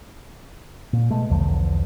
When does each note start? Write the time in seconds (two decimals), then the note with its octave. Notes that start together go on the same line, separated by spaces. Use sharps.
0.93 A#2
1.11 B2 G#3 A3
1.30 B1 E2 D3 F3